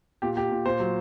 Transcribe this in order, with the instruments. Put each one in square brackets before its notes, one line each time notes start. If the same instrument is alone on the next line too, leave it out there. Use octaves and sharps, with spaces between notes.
[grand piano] A#2 G4
A#2 G4
A#2
A#2 C5
F#3